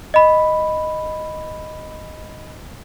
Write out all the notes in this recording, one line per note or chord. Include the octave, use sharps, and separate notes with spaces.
D#5 B5